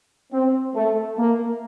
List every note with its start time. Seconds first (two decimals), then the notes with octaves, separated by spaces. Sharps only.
0.32 C4
0.75 A3
1.18 A#3